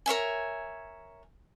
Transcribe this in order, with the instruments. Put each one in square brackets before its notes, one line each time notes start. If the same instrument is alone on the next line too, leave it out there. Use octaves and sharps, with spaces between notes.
[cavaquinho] A#4 C#5 E5 G#5